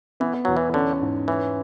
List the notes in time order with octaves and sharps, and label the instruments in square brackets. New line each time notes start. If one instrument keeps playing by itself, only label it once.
[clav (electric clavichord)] E3 [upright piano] B3
[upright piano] E2 [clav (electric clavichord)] F#3
[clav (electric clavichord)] E3
[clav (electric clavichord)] D3 [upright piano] C#4
[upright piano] G#2
[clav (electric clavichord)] E3 [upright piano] C#4